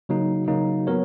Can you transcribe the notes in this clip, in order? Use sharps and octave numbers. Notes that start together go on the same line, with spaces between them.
C#3 F#3 A#3 D#4
C#3 F#3 A#3 D#4
F#3 B3 F#4 A#4 C#5